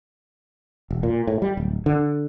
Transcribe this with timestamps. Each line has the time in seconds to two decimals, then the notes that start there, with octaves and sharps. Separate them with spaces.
0.91 E1
1.03 A#2
1.27 A2
1.42 G3
1.57 D1
1.86 D3